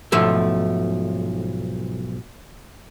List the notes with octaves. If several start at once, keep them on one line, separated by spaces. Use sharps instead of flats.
B1 G#2 F3 A3